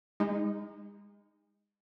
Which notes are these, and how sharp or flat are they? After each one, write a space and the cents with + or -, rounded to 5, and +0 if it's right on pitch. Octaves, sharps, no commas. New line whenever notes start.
G#3 -35 D#4 +5